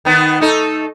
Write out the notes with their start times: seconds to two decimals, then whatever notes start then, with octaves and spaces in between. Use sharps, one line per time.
0.05 D#3 B3 D#4
0.40 A3 D#4 A4